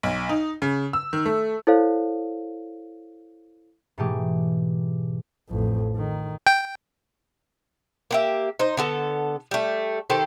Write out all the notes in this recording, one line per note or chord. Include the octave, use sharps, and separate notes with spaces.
B1
D#4
C#3
E6
D#3
A3
E4 A4 C5 C#5 F5
G#2 B2 E3 A3 G4 G#4
A1 F2
D#3
G5
A#3 G4 E5
D#4 C5
D3 B3 A4
G3 A3
D#3 G4 A4 C5